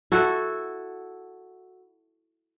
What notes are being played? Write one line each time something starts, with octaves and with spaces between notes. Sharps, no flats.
E4 F#4 A4